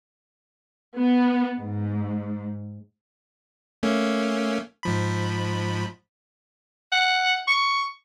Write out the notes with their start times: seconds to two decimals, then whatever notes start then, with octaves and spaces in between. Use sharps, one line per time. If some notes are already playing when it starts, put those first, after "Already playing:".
0.98 B3
1.58 G#2
3.83 A3 A#3 C#4
4.83 G#2 F3 B5
6.92 F#5
7.47 C#6